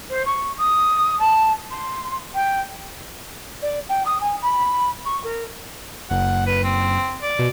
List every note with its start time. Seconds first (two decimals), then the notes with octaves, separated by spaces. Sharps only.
0.09 C5
0.25 C#6
0.57 D#6
1.19 A5
1.70 C6
2.34 G5
3.62 D5
3.89 G5
4.05 D#6
4.20 G#5
4.41 B5
5.05 C#6
5.23 A#4
6.11 F#1 F#5
6.46 B4
6.64 C4
7.22 D5
7.39 B2